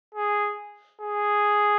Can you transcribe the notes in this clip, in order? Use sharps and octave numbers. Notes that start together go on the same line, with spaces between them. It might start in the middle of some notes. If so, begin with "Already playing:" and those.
G#4
G#4